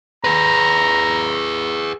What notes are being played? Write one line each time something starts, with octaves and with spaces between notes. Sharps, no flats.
G#4 B4 A#5